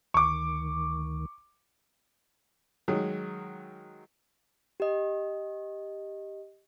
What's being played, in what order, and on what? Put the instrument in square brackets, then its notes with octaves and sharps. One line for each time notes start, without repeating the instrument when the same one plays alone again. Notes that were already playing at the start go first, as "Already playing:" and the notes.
[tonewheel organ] D2 D#3 [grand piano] C#6 D6
[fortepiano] D#3 F#3 G#3
[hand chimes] G4 D#5